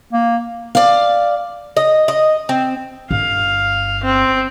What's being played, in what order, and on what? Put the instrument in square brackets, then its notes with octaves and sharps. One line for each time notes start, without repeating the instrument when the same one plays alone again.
[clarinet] A#3
[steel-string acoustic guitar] D5 F5
[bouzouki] D#5
D#5
C4
[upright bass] G1 [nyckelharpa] F5
[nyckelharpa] C4